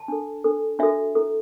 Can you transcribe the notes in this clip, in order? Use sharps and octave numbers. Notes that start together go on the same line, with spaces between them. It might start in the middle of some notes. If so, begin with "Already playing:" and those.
Already playing: A5
D4 A4
D4 A4
D4 F#4 A4 E5
E4 A4